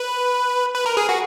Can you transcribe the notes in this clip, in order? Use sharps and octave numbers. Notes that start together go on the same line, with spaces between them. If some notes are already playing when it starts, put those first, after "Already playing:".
Already playing: B4
B4
A#4
G#4
F#4